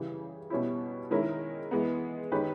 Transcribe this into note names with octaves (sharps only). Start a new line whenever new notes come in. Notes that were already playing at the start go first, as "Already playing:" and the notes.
Already playing: C#3 E3 G3
B2 G3 C#4 E4
D#3 G#3 C#4 E4 A#4
E3 G#3 B3
D#3 G#3 C#4 G4 B4